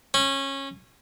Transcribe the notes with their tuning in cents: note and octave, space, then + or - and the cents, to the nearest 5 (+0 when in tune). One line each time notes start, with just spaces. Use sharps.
C#4 -20